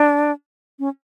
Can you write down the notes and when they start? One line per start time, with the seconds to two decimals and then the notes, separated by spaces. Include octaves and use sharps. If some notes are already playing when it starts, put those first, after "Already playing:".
Already playing: D4
0.79 C#4